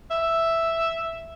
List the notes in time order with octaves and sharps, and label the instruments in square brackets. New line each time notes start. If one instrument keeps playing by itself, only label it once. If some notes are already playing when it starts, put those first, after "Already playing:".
[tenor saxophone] E5